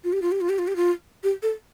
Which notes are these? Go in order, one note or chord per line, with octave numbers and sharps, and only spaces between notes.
F4
G4
F4
G4
F4
G4
F4
G4
F4
G4
A4